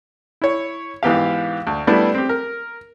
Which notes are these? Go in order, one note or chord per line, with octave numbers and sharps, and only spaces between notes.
E4 C#5
G#2 E3 B3 G4 F5
D2
G3 A3 B3 D4 E4
C4 G4
A#4